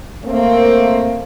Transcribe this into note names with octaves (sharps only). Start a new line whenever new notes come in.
A3 A#3 C4